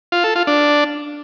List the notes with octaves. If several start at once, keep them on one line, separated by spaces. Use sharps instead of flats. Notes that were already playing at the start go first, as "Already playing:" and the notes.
F4
A4
F4
D4